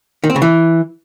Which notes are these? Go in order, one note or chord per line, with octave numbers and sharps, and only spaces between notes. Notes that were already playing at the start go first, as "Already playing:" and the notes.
D#3
C4
C#3
E3